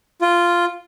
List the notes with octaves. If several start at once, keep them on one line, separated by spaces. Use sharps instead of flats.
F4